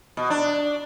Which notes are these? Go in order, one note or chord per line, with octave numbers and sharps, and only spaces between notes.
B2
D4